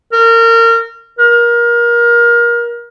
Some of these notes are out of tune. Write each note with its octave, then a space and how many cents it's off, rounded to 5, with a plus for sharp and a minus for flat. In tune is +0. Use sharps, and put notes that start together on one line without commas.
A#4 -25
A#4 +25